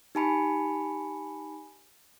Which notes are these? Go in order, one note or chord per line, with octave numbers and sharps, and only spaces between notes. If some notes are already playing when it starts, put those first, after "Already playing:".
D#4 G4 G#5 A5 B5 C#7